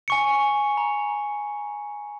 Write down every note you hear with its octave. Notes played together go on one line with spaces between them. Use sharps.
G#5 C#6 C#7
A#5